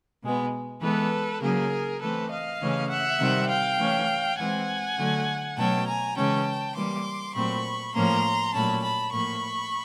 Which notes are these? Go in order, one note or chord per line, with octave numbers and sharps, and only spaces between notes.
B2 G#3 B3
E3 G#3 B3 A4 B4
C#3 F#3 A#3 G#4 A#4
E3 A3 C4 A4 B4
D#5 F5
C#3 E3 A3 C#4
E5 F#5
C3 D#3 G3 C4
F5 G5
E3 A3 C#4
E3 G#3 C4 F#5 G#5
D3 F#3 A3
B2 F#3 A3 C#4 G5 A5
G#5 A#5
C#3 E3 G#3 C#4 G5 A5
E3 G3 A#3 C6 D6
A#2 F#3 A3 C4 B5 C#6
A2 F3 A#3 C#4 A#5 C6
A#2 F#3 A3 C#4 A5 B5
A5 B5
A2 F3 A#3 B5 C#6